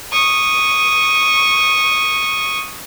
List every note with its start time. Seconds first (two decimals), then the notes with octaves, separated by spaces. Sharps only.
0.12 C#6 D#6